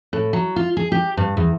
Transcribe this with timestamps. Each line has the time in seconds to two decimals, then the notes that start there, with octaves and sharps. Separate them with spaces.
0.13 A2
0.33 F#3
0.56 F4
0.77 G#4
0.92 G4
1.17 G2
1.37 E2